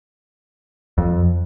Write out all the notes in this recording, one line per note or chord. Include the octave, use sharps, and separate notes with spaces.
F2